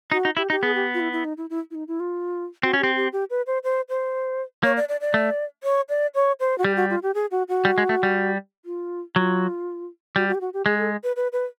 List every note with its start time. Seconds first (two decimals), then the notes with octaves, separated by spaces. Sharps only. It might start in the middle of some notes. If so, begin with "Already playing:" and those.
0.12 D#4 F#4
0.25 D#4
0.37 E4 G4
0.50 D#4 G4
0.63 B3 G#4
0.75 G4
0.94 F4
1.00 E4
1.12 E4
1.25 D#4
1.37 E4
1.50 E4
1.71 E4
1.75 D#4
1.88 E4
2.00 F4
2.63 C4 F#4
2.73 C#4
2.80 C4 G4
2.96 G4
3.13 G4
3.30 B4
3.47 C5
3.64 C5
3.89 C5
4.63 A#3 C#5
4.77 D5
4.89 D5
5.01 D5
5.14 A3
5.64 C#5
5.89 D5
6.15 C#5
6.40 C5
6.58 F#4
6.64 G3 G4
6.76 F#4
6.90 F4
7.03 G4
7.14 G#4
7.31 F#4
7.49 F#4
7.65 G3
7.78 G#3
7.89 A3
8.03 G3
8.65 F4
9.16 F#3 F4
10.16 G3 F#4
10.28 F#4
10.35 G4
10.41 F#4
10.53 G4
10.66 G#3 G#4
10.78 A4
11.04 B4
11.16 B4
11.33 B4